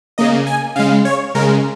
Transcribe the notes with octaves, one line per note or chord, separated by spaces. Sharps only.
C#3 A#3 D#5
G#5
C#3 G#3 F5
C#5
C#3 G#3 A#4